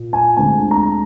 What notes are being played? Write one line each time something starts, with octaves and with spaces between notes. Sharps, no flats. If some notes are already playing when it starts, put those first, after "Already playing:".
Already playing: A#2
G#5
D2 D3 G#3 C4 G#5
A#5